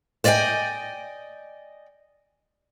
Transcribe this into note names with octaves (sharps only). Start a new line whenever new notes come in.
C5 D5 D#5 F5 G5 G#5